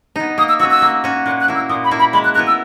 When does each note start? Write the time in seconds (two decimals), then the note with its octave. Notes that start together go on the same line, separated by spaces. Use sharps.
0.16 B3 D#4
0.38 A#3 D#6
0.49 E6
0.59 F#4 E6
0.63 C#4
0.70 E6
0.82 A#3
1.04 C#4 F#4
1.26 A#2 F#6
1.40 F#6
1.48 A#3 E4
1.55 E6
1.69 A#2 D#6
1.84 B5
1.91 A#3 E4
1.99 B5
2.13 G#3 B5
2.24 F#6
2.35 B3 E4 A#4 F#6
2.47 E6